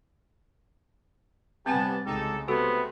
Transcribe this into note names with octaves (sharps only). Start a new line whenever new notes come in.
C3 G3 B3 C4 G4 F#5 G#5 A5
C2 C#3 G#3 D#4 G4 A4
C3 A3 B3 C4 F#4 A4